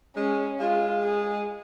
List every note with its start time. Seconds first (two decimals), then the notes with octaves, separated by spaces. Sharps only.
0.16 G#3 C#4
0.60 G#3 F4
1.03 G#4